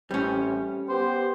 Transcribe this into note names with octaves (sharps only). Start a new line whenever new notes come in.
A1 A2 G3 C4 C#4
B3 G4 C5